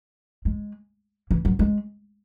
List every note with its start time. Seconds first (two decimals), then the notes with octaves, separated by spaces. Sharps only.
0.45 G#3
1.31 E3
1.45 F#3
1.59 G#3